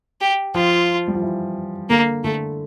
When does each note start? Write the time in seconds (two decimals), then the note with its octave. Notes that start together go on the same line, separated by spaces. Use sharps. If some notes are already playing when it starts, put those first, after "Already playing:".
0.21 G4
0.55 F3 F4
1.08 G3
1.15 F3
1.22 E3
1.90 D3 A#3
2.24 D3 A3